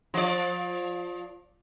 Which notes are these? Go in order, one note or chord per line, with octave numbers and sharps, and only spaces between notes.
F3 D5